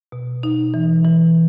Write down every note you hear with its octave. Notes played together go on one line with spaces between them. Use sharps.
B2
D#4
E3
E3